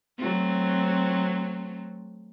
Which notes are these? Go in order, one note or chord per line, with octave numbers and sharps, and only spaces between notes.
F#3 A3 C4